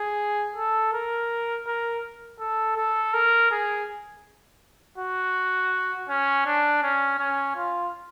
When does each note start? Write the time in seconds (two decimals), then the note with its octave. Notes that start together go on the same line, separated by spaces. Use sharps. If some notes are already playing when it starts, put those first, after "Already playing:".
Already playing: G#4
0.56 A4
0.93 A#4
1.66 A#4
2.40 A4
2.77 A4
3.13 A#4
3.51 G#4
4.98 F#4
6.09 C#4
6.46 D4
6.83 C#4
7.19 C#4
7.56 F4